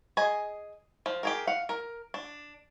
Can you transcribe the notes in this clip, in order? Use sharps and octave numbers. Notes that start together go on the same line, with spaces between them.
G#4 D#5 G#5
F3
G4 G#4 A#4
F5 F#5
A#4
D4